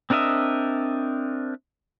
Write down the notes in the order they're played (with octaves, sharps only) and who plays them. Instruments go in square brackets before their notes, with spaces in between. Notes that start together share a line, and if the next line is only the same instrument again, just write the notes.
[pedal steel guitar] C4 D4 A#4 D#5 E5